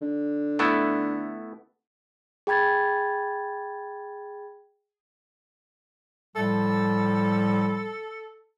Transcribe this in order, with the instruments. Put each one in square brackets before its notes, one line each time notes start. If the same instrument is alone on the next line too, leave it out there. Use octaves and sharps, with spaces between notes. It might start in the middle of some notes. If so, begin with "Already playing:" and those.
[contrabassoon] D3
[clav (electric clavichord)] A3 B3 E4
[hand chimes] G#4 G5 B5 G#6 A6
[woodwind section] A2 F3 G3 [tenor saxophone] A4